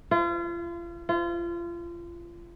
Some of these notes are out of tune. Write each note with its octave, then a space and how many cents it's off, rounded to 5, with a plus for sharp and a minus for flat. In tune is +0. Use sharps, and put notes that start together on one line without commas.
F4 -35
F4 -30